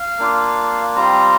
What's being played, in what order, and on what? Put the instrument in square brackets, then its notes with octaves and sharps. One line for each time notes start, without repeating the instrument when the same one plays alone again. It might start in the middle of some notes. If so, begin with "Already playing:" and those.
Already playing: [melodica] F5
A#3 D4 F4
G3 C4 F4 A#5